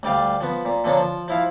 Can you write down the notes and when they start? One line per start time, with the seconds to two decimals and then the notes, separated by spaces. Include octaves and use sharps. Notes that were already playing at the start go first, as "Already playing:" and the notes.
0.03 D2 G3 D5 F5
0.41 F3 B3
0.65 A#2
0.84 D3 F3 A#3 C#4 D4
0.97 F3
1.28 F3 E4 F5